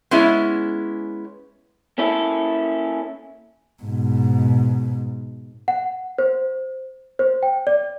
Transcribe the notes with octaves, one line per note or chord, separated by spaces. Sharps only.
G#3 B3 C#4 E4
A#3 C#4 E4 A4
G#2 B2
F#5
C5
C5
G5
D5